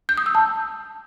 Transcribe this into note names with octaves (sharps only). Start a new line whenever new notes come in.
G6
D#6
E6
A5